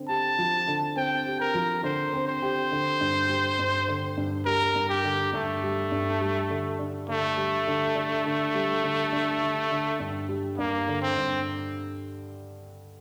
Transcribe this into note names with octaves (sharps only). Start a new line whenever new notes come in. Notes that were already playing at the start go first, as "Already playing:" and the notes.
Already playing: D3 C4
G4 A5
F3
D3
C4 G5
G4
A#4
F3
D3 C5
C4
C5
G4
D3
G2
G3
G2
D3
G2
G3 A#4
G2
G4
D3
G2 A3
G3
G2
G3
D3
D4
D3 A3
G3
D3
D4
D3
G3
D3
D4
D3
D3
G2
G3
G2 A#3
D3
C4
G2